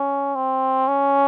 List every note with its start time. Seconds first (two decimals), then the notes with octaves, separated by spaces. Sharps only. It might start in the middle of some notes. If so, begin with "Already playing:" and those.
Already playing: C#4
0.36 C4
0.88 C#4